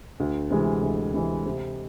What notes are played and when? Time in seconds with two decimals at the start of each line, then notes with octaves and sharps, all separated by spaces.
0.20 D2
0.51 C3 E3 G#3
0.83 D2
1.13 C3 E3 G#3
1.46 C3